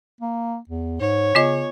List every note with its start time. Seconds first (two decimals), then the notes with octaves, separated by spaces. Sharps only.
0.21 A#3
0.69 E2
1.00 G#2 C#5
1.35 C#3 B3 F4 D#5